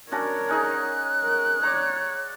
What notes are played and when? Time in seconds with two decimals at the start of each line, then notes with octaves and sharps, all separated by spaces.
0.11 C#4 D4 F#4 A#4 C#5
0.48 C#4 D#4 G#4 F#6
1.24 A#4
1.63 C#5 D5 A#5